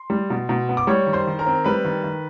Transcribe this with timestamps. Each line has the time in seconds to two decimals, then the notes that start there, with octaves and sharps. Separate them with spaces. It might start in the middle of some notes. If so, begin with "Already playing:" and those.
Already playing: C6
0.10 G3
0.30 B2
0.49 B2
0.69 B3
0.77 D6
0.87 G3 C#5 C#6
1.06 D#3
1.13 C5 C6
1.27 D#3
1.39 A#4 A#5
1.46 C4
1.64 G3 B4 B5
1.85 D#3
2.04 D#3